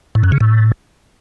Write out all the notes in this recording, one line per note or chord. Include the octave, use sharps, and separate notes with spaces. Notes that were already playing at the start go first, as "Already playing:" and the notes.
A2
F#2
C#3
A2